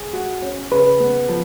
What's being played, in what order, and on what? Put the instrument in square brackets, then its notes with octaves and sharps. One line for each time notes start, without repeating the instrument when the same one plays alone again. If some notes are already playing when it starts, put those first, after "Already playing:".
Already playing: [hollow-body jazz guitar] G#4
[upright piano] F#4
C#4
[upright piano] C#3 [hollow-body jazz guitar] B4
[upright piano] B3
F3